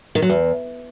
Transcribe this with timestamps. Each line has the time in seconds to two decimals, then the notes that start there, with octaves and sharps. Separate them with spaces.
0.15 D#3
0.22 F#3
0.29 E2